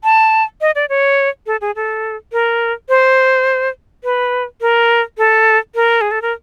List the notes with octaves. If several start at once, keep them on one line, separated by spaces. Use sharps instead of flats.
A5
D#5
D5
C#5
A4
G#4
A4
A#4
C5
B4
A#4
A4
A#4
G#4
A4
A#4